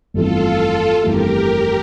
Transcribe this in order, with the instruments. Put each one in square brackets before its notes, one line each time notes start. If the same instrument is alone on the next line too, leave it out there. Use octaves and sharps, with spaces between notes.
[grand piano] G1 F2 E3 A3 [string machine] F4 A4
[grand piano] G1 F2 E3 A3 [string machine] G4 A#4